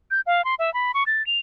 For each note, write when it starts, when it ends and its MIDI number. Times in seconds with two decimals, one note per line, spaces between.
0.11 0.21 91
0.27 0.44 77
0.45 0.55 84
0.59 0.73 76
0.74 0.92 83
0.94 1.04 85
1.07 1.25 93
1.27 1.39 101